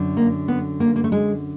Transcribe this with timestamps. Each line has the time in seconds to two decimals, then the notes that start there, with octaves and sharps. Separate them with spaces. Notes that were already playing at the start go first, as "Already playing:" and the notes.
Already playing: F#2 D3
0.17 A#3
0.48 B3
0.80 A#3
0.96 A#3
1.04 A3
1.12 G#3